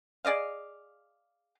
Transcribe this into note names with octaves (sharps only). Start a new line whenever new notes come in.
G#4 D5 D#5 F5